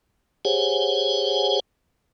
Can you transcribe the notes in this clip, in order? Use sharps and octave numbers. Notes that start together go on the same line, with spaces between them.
G4 G#4 C5 C#5 F#5 G#5